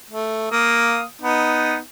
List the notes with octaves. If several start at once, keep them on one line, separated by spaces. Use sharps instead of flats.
A3
A#3 F5 D#6
B3 D#4